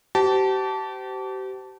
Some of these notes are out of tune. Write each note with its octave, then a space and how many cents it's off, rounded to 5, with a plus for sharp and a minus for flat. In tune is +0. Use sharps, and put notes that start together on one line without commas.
G4 -35 C5 -30 A5 +0